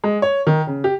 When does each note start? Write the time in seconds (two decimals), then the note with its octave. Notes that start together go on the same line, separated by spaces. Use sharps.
0.04 G#3
0.22 C#5
0.47 D#3
0.67 C#3
0.84 G4